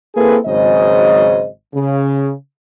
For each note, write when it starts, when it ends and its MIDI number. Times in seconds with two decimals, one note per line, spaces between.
0.15 0.37 58
0.15 0.37 60
0.15 0.37 64
0.15 0.37 68
0.15 0.37 69
0.15 0.37 71
0.45 1.48 32
0.45 1.48 44
0.45 1.48 49
0.45 1.48 54
0.45 1.48 72
0.45 1.48 75
1.74 2.32 49